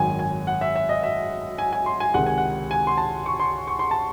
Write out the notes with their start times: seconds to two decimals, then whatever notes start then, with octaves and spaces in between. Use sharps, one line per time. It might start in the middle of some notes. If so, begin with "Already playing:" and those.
Already playing: G#1 F#2 D#3 G#5
0.19 G#5
0.47 F#5
0.61 E5
0.76 E5
0.89 D#5
1.03 E5
1.58 G#5
1.73 G#5
1.86 C6
2.00 G#5
2.14 C#2 C3 D#3 F#5
2.26 G#5
2.38 F#5
2.71 G#5
2.87 C6
2.97 A5
3.26 C#6
3.40 C6
3.68 C#6
3.79 C6
3.91 A5